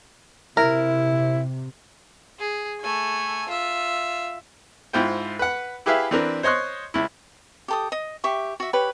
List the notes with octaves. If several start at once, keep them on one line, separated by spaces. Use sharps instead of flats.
C3 E4 A#4
G#4
A3 G#5
F4 E5
G#2 E4 F4 C5 G5
B4 F#5
E4 G4 G#4 B4 E5 F5
E3 C4 D4 A#4 B4
C5 C#5 D#5 C6 C#6 F#6
C#2 E4
G4 A4 D#6
D#5
G4 E5 C#6
F#4 E5
G4 B4 C#5